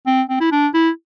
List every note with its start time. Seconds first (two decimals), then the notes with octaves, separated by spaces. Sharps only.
0.07 C4
0.30 C4
0.41 E4
0.52 D4
0.74 E4